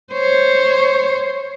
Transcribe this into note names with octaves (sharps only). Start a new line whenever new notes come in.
C5 C#5